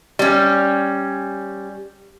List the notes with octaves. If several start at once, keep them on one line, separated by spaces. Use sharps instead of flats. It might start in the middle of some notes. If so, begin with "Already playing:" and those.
G3 C#4